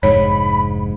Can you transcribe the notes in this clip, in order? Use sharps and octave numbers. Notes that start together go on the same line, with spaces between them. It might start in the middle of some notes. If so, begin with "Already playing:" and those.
F1 G#2 C#5 B5